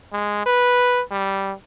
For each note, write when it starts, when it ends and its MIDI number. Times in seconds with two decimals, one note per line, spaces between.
0.13 0.43 56
0.46 1.01 71
1.11 1.52 55